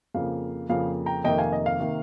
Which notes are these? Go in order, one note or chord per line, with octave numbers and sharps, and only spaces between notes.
F2 C#3 F3 A#3 F5
F2 C#3 F3 A#3 F5
G5 A#5
F1 F2 C3 D#3 A#3 D#5 G5
F5 G#5
D#5
F5
C3 D#3 A#3